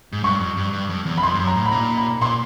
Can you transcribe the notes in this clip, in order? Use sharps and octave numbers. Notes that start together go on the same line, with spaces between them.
G#2
G2 C#6
F2
G2
G2
F2
E2
B5
F2 C6
G2
F#2
A#5
A2
B5
A#2 A#5
B5
A#2 C6